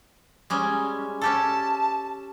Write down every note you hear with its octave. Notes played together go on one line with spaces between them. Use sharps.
G3 G#3 C#4
C#4 G4 A4 A5